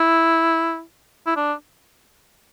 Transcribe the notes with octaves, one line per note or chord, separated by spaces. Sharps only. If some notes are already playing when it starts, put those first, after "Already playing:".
Already playing: E4
E4
D4